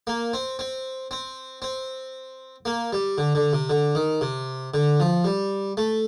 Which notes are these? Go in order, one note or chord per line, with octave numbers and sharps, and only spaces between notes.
A#3
C4
C4
C4
C4
A#3
G3
D3
D3
C3
D3
D#3
C3
D3
F3
G3
A3